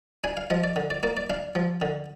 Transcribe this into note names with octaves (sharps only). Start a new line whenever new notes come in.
D4 G#5
F5
F3 D#5
D5
D3
D5
A#3 D5
D5
D4 F5
F3
D3